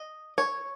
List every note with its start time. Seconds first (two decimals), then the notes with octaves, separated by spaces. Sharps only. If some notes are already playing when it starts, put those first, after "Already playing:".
Already playing: D#5
0.38 C#5